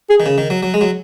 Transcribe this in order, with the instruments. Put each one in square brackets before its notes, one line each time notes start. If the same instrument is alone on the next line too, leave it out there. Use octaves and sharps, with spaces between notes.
[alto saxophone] G#4
[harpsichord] D#3
C#3
D#3
F#3
F#3
G#3
F#3